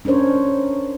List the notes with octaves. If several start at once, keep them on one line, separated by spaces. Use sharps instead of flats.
C#4 D4 A#4 C5 C#5